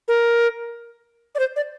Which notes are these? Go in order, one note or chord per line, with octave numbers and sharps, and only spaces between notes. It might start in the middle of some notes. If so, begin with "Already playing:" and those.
A#4
D5
C5
D5